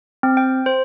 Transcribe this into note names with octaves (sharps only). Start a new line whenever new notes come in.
C4
G5
C5